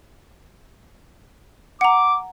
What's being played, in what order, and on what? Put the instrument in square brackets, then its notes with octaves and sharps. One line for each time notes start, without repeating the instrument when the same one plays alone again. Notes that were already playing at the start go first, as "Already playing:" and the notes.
[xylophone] F#5 A#5 [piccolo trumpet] D6